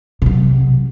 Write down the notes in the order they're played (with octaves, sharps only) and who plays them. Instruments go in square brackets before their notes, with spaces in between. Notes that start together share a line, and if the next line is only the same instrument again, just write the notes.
[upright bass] C3 F#3